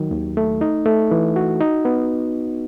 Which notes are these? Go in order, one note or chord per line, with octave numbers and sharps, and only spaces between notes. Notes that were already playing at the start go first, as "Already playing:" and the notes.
Already playing: D#3 F#3
D#2
A3
D#4
A3
E3
F#4
D#4
B3